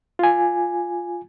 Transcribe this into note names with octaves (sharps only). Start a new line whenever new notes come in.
F4 G#5